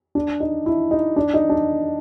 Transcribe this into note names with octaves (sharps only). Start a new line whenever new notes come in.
D4
D#4
E4
D#4
D4
D#4
D4